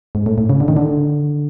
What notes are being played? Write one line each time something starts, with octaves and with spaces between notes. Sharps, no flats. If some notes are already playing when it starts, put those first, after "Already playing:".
G#2
A2
A2
C#3
D3
D#3
D3